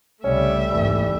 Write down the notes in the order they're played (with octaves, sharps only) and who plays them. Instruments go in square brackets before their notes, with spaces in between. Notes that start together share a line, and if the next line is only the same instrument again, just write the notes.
[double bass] C2 C#3 [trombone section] G3 [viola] A3 E5 [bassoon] C#4
[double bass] G#1 D#2 [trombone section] E3 [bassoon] G3